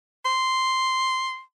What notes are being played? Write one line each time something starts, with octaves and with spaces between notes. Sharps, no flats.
C6